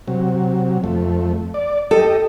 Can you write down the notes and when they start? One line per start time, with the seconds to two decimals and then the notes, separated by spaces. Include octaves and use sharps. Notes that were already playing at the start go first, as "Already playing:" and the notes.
0.08 C3 F#3
0.84 F2 A3
1.54 D5
1.91 G4 A4 D#5